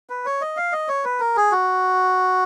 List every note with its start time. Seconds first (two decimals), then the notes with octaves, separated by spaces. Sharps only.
0.10 B4
0.26 C#5
0.41 D#5
0.57 F5
0.72 D#5
0.88 C#5
1.04 B4
1.20 A#4
1.37 G#4
1.52 F#4